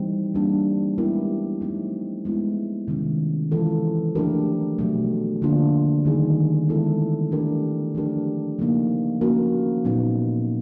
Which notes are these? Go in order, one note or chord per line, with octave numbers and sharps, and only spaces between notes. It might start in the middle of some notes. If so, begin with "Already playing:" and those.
Already playing: E3 G3 C4 D#4
G3 A#3 D4
G#3 B3 E4 G4 A#4
F3 A3 C4 D#4
G#3 B3 E4
C3 D#3 G#3 C#4
E3 G#3 C4 F4 A4
F3 A3 D4 G4 A#4
B2 F#3 A3
D3 F3 A#3 D4 F4
D#3 G3 B3 D#4 G#4
E3 G#3 B3 E4 A4
E3 A3 D4 G4 A#4
F3 A3 D4 G4 A#4
C#3 F3 A#3 D#4
F3 A#3 C#4 F#4 A#4
A#2 F#3 B3 D#4